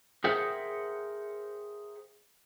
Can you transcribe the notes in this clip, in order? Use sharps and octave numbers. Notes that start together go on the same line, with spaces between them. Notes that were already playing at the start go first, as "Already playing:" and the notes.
G#4 A#4 C5 E5 F#5 G5